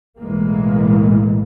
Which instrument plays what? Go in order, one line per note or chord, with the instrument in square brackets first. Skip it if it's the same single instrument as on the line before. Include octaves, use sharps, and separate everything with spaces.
[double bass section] B1 A2 E3 G#3 A#3